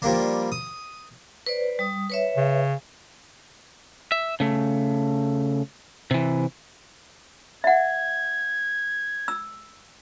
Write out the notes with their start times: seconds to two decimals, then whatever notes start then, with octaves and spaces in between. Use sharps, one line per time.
0.02 F3 G3 A#3 D4
0.52 D#6
1.46 B4 C5 D5
1.79 G3 D#6
2.10 B4 C#5 E5
2.37 C#3
4.12 E5
4.40 C#3 A3
6.11 C3 E3
7.64 E5 F#5 G#6
9.28 E6